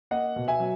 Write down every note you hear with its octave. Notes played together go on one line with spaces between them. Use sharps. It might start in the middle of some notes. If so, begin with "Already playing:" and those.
A#3 D#5 F#5
B2
E5 G#5
F#3